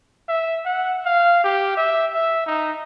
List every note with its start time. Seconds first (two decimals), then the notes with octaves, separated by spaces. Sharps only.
0.28 E5
0.65 F#5
1.05 F5
1.44 G4
1.77 E5
2.14 E5
2.46 D#4